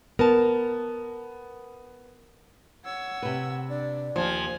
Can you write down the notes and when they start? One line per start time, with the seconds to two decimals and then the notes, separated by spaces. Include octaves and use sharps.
0.19 B3 A#4 A5
2.84 C#5 F#5 E6
3.22 C3 B4
3.69 D4 D5
4.16 D#2 F3 G#5